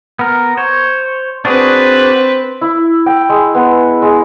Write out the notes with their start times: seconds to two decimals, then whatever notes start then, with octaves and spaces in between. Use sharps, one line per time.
0.19 B3 A#4
0.57 C5 C#5
1.45 C4 D4 F#4 G#4 B4
2.61 E4
3.06 G5
3.29 G#3
3.55 B3
4.02 G#3